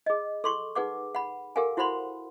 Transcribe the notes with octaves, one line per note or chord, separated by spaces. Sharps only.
G#4 D#5
A4 C6 C#6
D#4 G#4 B4 F#5 D6
F#5 B5
G4 A4 A#4 F5 F#5 G#5
E4 F#4 C5 F#5 B5 C6